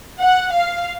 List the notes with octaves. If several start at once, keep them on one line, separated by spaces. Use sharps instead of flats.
F#5
F5